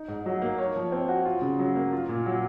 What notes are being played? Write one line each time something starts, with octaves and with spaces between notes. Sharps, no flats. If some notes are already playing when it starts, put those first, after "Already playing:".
Already playing: D#4
G#2
F#3
A#3
C#5
F3
C4
F#4
F4
C#3
F#3
A#3
F4
A#2
F#3